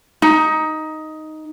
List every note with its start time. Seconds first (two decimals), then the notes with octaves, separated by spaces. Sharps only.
0.22 D#4